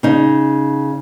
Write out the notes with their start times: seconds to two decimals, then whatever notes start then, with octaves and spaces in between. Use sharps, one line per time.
0.03 C#3 D#4